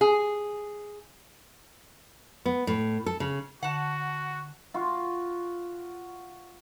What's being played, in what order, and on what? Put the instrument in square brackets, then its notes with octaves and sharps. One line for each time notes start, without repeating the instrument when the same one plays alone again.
[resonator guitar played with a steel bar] G#4
[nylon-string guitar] B3
A2
A4
C#3
[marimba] D3 [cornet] F#4 [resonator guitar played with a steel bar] F#5 A5
[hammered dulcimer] F4 F#4